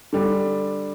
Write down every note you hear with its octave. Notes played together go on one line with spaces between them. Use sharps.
D3 G3 D4